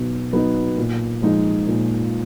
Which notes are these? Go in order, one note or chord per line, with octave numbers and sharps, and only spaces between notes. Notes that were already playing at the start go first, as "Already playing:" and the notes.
Already playing: B2 F#3 B3 D#4
F#3 B3 D#4
A#2
F3 G#3 D#4
A#2